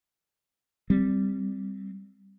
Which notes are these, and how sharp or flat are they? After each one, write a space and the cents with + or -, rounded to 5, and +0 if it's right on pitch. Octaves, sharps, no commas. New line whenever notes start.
G3 +0 C4 +0